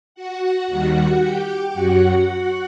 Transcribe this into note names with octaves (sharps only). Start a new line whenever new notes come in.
F#4 F#5
D#2 D#3 G3
G4 G5
F#2 F#3 F#4 F#5
F#4 F#5